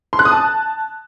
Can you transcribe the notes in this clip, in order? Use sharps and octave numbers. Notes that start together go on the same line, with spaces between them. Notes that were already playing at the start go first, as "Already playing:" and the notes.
C6
F#6
D#6
A5